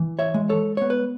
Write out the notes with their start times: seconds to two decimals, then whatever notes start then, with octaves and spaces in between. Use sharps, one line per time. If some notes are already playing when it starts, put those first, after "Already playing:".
Already playing: E3
0.19 C#5 E5
0.34 G#3
0.49 A4 C#5
0.77 B3 C#5
0.90 B4